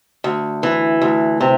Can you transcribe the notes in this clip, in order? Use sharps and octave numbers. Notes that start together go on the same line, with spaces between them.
D2
E3
D2
C3